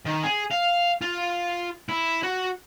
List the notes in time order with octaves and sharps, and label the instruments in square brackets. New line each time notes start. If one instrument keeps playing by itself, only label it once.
[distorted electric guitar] D#3
G#4
F5
F4
E4
F#4